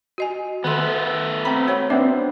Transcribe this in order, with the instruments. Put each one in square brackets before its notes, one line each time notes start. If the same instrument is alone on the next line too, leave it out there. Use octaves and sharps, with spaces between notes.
[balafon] F#4 D#5 G#5
[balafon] D#3 A4 C6 [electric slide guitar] A3 B3
[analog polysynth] C4 B5 [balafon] A#5
[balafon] F#4 C#5 F#5
[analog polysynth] B3 C4 D4 [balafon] E5